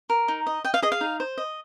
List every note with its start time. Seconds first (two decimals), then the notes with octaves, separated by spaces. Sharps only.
0.10 A#4
0.28 D#4
0.47 D#5
0.65 D#5 G5
0.74 F5
0.82 G#4 D#5
0.92 F5
1.01 D#4
1.20 C5
1.38 D#5